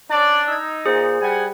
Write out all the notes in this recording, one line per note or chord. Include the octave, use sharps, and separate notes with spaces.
C#4 D4 D5
D#4 E6 G#6
A#2 G#4 C5
G3 F#5 G#5